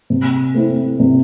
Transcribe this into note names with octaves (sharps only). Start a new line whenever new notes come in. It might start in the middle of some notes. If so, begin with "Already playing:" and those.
C3
A3 C4 E4
C3